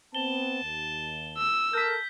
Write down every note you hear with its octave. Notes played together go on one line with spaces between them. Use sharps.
B3 C4 A5 G7
D#2
E6
A4 A#4 A5 G6 B6